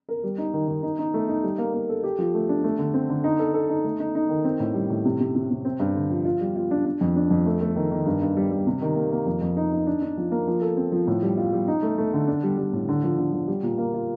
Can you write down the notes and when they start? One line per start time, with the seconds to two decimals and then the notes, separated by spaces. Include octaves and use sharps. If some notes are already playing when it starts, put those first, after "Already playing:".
0.09 A#4
0.23 G3
0.38 D#4
0.53 D#3
0.68 D#3
0.83 D#4
0.99 D#4
1.14 A3
1.28 D#4
1.43 G3
1.58 A#3
1.73 A#3
1.89 A4
2.03 G4
2.19 F3
2.34 A3
2.49 D4
2.64 A3
2.79 D3
2.94 C4
3.10 D3
3.24 D#4
3.39 A4
3.54 A4
3.70 D#4
3.84 A3
4.00 D#4
4.15 D#4
4.29 D#3
4.44 C4
4.60 A2
4.74 G3
4.90 A2
5.05 C3
5.20 C3
5.35 C3
5.51 C3
5.65 C4
5.80 G2
5.96 D3
6.10 F3
6.25 F4
6.41 G3
6.56 F4
6.71 D4
6.85 D4
7.01 F2
7.16 D4
7.31 F2
7.46 A3
7.61 A3
7.76 D#3
7.91 D#3
8.06 G2
8.22 G2
8.36 G3
8.51 G3
8.67 C3
8.81 D#3
8.96 A#3
9.11 A#3
9.26 F2
9.41 F2
9.57 D#4
9.72 D#4
9.87 D4
10.01 D4
10.17 F3
10.31 A#3
10.47 F3
10.62 A4
10.77 C4
10.92 F3
11.07 A2
11.23 G3
11.37 F4
11.53 G3
11.68 D#4
11.82 A3
11.98 A3
12.13 D3
12.27 D4
12.43 G3
12.58 G3
12.73 A2
12.89 D3
13.03 F3
13.18 D3
13.33 F3
13.48 G3
13.63 A#2
13.78 A#3
13.94 F4